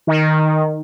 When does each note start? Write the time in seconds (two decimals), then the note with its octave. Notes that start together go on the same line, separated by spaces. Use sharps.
0.07 D#3